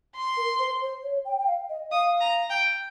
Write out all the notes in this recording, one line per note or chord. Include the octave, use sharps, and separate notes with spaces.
C6
A#4
C5
C5
C#5
G5
G5
F5
D#5
F5 D#6
A#5
G5